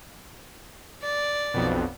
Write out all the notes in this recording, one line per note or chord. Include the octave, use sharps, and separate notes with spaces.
D5
B1 F2 B2